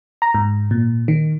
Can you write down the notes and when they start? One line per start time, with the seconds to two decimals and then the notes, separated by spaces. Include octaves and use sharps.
0.22 A#5
0.34 G#2
0.71 A#2
1.08 D#3